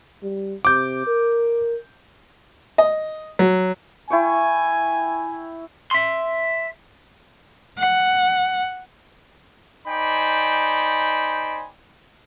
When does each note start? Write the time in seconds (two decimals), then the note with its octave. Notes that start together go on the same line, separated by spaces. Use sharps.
0.22 G3
0.65 C3 D6 G6
1.06 A#4
2.78 D#5
3.39 F#3
4.10 E4 G5 G#5 C#6
5.91 E5 C6
7.78 F#5
9.88 D#4 C5 D5 G5 G#5 B5